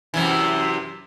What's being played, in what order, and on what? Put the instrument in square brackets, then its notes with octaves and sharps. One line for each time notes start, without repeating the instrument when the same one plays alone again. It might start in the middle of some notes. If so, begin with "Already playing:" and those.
[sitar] F#2 C3 E3